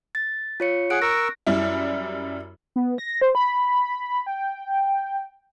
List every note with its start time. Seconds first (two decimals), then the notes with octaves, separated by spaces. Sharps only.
0.15 A6
0.60 F4 C#5 C#7
0.90 G#4 F#5 F#6 D7
1.02 A#4 C#6 E6 A#6
1.47 F#2 G3 E4
2.76 B3
2.98 A#6
3.21 C5
3.35 B5
4.27 G5